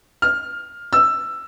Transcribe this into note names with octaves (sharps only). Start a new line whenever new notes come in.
F6
E6